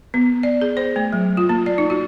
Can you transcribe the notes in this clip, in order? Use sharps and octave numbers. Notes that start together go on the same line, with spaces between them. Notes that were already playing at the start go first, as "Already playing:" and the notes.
B3
D5
G#4
C5
A3
F#3
F4
A#3
D5
D#4
F#4